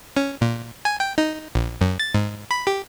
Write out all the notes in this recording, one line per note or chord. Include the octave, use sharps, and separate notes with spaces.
C#4
A#2
G#5
G5
D#4
A#1
F#2
A6
G#2
B5
G4